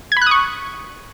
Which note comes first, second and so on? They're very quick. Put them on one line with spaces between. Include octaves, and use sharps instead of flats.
G#6 B5 F#6 D#6 C#6